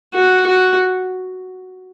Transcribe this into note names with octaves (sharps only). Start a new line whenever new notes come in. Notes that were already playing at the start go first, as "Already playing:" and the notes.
F#4
F#4